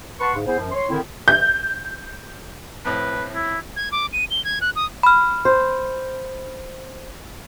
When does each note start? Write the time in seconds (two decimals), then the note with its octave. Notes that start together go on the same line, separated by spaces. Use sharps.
0.20 B4 F#5 A5 C6 C#6
0.34 G#2 C#3
0.46 B3 E4 G#4 C5
0.59 F#2 F3
0.72 C#5 C6
0.89 D3 D#3 C4 E4
1.28 G6
2.85 F2 A2 B4
3.35 E4
3.76 G#6
3.92 D6
4.13 D#7
4.31 G7
4.45 G#6
4.61 F#6
4.76 D#6
5.03 B5 F6
5.45 C5